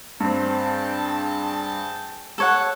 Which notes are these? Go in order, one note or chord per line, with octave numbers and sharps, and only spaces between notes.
G2 C4 G#4 G5 A5
A4 C#5 F#5